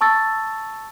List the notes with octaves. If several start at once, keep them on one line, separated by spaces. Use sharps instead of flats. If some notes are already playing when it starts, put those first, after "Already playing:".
A5 C#6 E6 A6